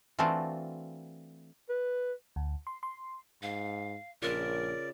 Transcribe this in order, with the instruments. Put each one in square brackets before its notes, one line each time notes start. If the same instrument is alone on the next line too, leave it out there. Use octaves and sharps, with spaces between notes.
[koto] E3 A3 C4 D4 F4 F#4
[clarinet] B4
[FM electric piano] D2
C6
C6
[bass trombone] G#2 [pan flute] F5
[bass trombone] A#1 [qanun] C#3 F4 E5 [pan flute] A#4 [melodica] D5